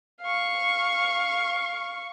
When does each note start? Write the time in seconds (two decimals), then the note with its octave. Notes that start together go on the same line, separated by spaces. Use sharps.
0.22 F5 C#6